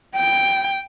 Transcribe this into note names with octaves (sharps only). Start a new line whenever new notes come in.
G5